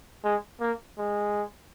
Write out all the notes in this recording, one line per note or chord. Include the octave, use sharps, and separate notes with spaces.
G#3
A#3
G#3